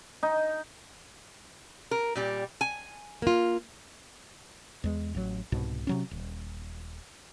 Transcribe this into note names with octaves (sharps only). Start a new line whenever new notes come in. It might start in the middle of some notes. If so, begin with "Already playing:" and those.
D#4
A#4
A#2 G3 G4
G#5
A#3 F4
E2 G#3
A1 F#3
C2 G#2 B2
C3 F#3 C#4
D#1